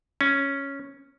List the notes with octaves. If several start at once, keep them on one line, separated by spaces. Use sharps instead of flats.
C#4